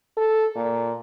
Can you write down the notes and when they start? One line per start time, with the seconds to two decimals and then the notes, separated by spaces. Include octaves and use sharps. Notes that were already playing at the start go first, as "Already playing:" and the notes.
0.17 A4
0.56 A#2